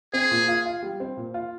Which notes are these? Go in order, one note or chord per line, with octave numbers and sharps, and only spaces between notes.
C4 G#4
A#2
F4
F4
G3
C4
A#2
F4